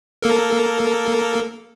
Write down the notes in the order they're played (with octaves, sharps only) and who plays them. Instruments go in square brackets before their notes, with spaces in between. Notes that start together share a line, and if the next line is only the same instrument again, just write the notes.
[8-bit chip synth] A#3 A4 A#4